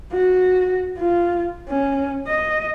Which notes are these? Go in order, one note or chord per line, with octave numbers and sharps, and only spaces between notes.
F#4
F4
C#4
D#5